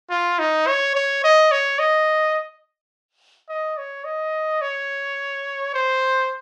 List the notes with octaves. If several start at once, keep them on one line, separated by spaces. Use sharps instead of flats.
F4
D#4
C#5
C#5
D#5
C#5
D#5
D#5
C#5
D#5
C#5
C5